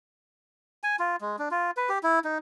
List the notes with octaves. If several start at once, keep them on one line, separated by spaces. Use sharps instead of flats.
G#5
F4
G#3
D4
F4
B4
G4
E4
D#4